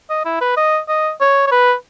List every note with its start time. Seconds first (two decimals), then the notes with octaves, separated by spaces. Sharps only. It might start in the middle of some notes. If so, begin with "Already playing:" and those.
0.10 D#5
0.25 E4
0.41 B4
0.57 D#5
0.89 D#5
1.21 C#5
1.47 C#5
1.52 B4